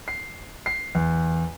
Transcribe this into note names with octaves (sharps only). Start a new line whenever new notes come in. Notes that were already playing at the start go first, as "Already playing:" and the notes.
C7
C7
E2